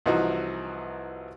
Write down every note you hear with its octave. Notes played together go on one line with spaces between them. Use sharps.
C2 E3 F3 D#4 F#4